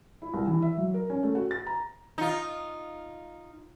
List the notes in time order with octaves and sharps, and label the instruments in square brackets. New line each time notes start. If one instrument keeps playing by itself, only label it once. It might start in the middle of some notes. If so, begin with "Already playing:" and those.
[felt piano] E4
C2
E3
E5
F#3
A#4
C#4
A3
F#4
A6
A#5
[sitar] D#4 F4